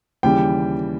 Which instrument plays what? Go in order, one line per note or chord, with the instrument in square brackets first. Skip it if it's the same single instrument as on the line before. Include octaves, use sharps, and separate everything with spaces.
[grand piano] D#2 C#3 E3 G3 G5